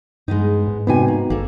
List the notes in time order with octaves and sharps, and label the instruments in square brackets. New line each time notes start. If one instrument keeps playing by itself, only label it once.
[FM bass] G2 [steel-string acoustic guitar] G#3 B3 D#4
[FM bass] G#2
[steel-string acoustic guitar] A2 C3 G#5 [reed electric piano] B3 D#4 F#4
[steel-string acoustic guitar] A#3
[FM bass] G1 [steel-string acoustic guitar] A#3 A4